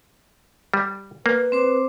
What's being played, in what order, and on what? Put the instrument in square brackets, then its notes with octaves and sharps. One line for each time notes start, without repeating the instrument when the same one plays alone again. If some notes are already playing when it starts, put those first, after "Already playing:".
[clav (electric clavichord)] G3
[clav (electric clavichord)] A#3 [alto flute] B4
[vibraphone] C4 C5 D6